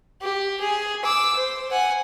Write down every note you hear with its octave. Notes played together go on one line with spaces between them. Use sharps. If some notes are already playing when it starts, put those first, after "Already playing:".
G4
G#4
D6 E6
C5
F#5 G#5